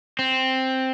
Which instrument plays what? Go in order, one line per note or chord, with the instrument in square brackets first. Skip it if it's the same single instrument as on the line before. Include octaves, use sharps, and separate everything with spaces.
[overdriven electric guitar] C4